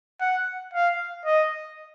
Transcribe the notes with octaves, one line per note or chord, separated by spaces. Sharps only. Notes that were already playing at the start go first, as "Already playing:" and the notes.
F#5
F5
D#5